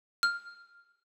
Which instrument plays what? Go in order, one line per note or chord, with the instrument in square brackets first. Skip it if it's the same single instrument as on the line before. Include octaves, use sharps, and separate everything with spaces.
[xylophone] F6